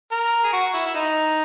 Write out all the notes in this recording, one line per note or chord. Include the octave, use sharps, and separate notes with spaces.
A#4
G#4
F#4
E4
E4
D#4